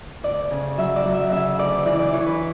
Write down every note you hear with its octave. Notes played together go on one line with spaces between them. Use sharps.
D2 D5
C#3
F#3 E5
D5
F#3
E5
C#3 E5
D2 D5
E3 D5
D5
E3 C#5
B4